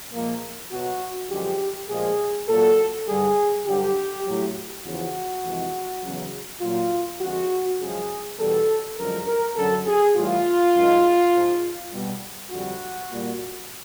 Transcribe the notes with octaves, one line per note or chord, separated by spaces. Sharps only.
A#2 F3 G#3 A#3
B2 F#3 F#4
F#2 D3 F3 G#3 G4
A#2 F3 G#3 G#4
A#2 F#3 A4
G2 D3 G3 G#4
G2 D3 F#3 G4
A2 F#3
E2 C#3 F3 F#4
F2 C3 E3 G#3
E2 C#3 F#3
A#2 F#3 F4
F2 D3 F3 G#3 F#4
F#2 C#3 F3 G#3 G#4
E2 B2 G3 A4
F#2 D3 F3 G#3 A#4
A#4
F#2 D3 F#3 A4
G#4
A2 E3 G3 F4
F#2 D#3 G#3
G#2 F3 G#3
B2 G3
F2 D3 G3 F#4
A#2 G3